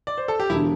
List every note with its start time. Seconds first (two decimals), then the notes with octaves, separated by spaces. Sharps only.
0.07 D5
0.18 C5
0.28 A4
0.40 G4
0.50 E1 E4
0.54 D3